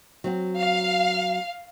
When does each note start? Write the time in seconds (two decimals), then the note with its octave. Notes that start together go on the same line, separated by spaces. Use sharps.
0.24 F#3 C4 F#4
0.59 F5